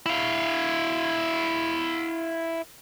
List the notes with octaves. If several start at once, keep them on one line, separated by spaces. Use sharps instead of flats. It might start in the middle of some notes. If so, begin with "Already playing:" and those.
E4 F5